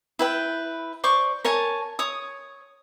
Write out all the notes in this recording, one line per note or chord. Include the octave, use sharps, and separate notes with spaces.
E4 B4 G5
C5 D5 C#6 D6
A#4 C#5 G#5 A5
C#5 D#6